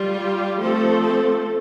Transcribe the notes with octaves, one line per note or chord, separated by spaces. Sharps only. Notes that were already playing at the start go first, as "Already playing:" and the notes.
Already playing: G3 F4
G4
F3 A3 C4 A4
A4